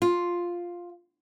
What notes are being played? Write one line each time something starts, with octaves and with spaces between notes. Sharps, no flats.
F4